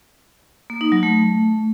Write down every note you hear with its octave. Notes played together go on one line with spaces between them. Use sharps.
A#3
D#4
F#3
A3